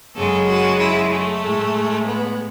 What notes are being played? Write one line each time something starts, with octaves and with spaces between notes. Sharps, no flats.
F#2 C#3 G#3 A4
F#4
E4
A3
A2 G#3
B3